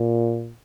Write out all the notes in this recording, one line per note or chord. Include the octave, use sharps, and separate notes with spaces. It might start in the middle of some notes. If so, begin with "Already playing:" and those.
Already playing: A#2